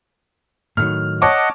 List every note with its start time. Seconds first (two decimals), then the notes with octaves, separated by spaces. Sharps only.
0.77 A2 D#3 F#3 F6
1.22 C#5 D#5 F#5 A5 D6